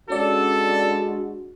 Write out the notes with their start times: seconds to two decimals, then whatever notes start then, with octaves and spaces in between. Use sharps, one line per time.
0.10 G#3 C#4 D4 F#4 A4 D5